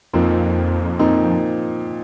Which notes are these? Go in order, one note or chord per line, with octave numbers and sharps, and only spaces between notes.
F2 A#2 F3 C4 D#4
A#2 F3 C4 D#4